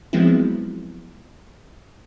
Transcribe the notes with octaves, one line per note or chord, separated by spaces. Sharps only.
F3 F#3 G#3 B3 C4 E4